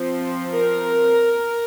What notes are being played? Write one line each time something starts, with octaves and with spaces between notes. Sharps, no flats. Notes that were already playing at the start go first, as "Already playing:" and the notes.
Already playing: F3 C4
A#4